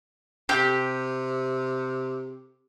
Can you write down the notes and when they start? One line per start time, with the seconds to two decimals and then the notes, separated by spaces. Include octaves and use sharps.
0.49 C3 G4